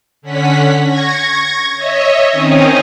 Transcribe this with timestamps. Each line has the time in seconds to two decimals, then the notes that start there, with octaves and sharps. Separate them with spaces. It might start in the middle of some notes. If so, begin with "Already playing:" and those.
0.22 D3 C#4 F#5 B6
0.85 C#6 G#6 A#6
1.76 C#5 D#5 E5
2.31 D#3 C4 C#4 D#4 D#5